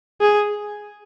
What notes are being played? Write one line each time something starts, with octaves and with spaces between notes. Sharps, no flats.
G#4